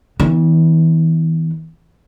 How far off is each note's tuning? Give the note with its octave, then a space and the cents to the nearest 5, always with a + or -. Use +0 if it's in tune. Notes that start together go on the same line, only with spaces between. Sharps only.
E3 -35 B3 +0